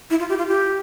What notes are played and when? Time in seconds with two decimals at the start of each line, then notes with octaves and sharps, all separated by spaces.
0.10 E4
0.20 F4
0.29 G4
0.38 F4
0.48 G4